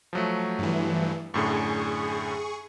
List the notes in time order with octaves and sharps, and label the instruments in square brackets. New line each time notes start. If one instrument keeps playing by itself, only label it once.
[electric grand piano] F3 F#3 A3
[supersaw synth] G2 E3
[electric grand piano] F#2 A2 D3 [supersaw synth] G#4 C#6